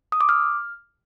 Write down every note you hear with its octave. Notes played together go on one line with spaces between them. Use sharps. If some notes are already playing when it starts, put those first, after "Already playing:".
D#6
D6
F6